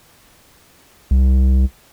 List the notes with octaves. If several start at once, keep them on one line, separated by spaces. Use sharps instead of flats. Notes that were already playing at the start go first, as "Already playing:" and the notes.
C2